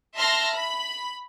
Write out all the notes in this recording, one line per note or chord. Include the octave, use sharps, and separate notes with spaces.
E5 A5 C6 F6 A#6
B5